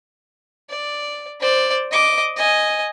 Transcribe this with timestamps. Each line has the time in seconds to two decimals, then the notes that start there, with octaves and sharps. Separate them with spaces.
0.70 D5
1.40 C5 D5
1.91 D#5 D6
2.37 D#5 G#5